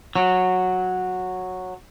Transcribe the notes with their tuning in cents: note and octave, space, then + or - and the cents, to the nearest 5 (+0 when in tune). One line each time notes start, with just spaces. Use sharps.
F#3 -10